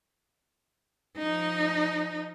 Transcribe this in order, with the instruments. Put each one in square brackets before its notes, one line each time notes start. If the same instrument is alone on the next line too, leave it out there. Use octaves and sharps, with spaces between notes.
[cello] F3 D#4